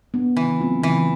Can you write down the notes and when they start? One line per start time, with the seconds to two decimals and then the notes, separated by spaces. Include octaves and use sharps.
0.14 B3 D4
0.36 C#3 E3
0.60 F#3 A3 C4 F4
0.82 C#3 E3